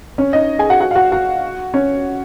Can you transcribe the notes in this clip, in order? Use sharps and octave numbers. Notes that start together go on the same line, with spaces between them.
C#4 C#5
D#4 D#5
G#4 G#5
F#4 F#5
F#4 F#5
F5
F#4 F#5
F#4 F#5
C#4 C#5